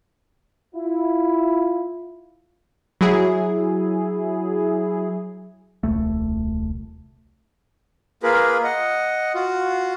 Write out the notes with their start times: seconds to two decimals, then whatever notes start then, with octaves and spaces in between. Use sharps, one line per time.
0.75 E4 F4
3.01 F#3 E4 G#4
5.83 D#1 C2 A3
8.23 A#3 F4 G#4 A#4 B4
8.64 D#5 F#5
9.34 F4 F#4